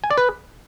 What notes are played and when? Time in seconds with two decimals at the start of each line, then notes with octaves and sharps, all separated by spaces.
0.04 G#5
0.11 D5
0.18 B4